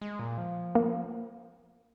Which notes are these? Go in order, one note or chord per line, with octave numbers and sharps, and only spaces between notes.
G#3
A#2
F3
A#3